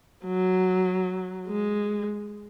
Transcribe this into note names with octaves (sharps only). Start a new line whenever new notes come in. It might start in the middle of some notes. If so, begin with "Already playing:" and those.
F#3
G#3